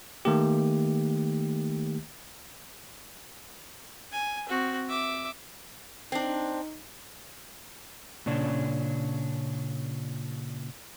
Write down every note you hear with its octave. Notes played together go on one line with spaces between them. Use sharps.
D#3 A3 A#3 G4
G#5
C4 F#4
E5 D6
C4 D4 D#4
A#2 C#3 C#4 D4